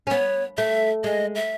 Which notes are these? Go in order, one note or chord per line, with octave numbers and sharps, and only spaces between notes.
C#4
B3 C#5
A3 E5
G#3 D#5
E5